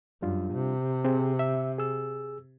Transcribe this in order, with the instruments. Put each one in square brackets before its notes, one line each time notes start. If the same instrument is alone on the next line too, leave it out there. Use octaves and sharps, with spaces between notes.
[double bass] F#2 [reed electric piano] G3 D4 F4
[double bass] C3
[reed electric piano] C4 G#4
E5
G#4 E6